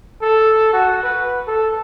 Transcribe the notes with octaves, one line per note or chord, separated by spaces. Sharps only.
A4
F#4
B4
A4